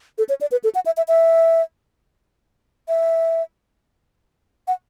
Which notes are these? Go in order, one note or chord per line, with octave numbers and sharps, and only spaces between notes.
A4
C#5
D5
B4
A4
F#5
E5
E5
E5
E5
F#5